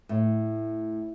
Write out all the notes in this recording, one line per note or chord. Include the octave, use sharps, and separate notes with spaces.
A2